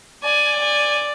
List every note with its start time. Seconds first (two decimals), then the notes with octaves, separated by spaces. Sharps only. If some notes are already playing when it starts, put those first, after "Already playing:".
0.24 D5 G#5
0.60 G#5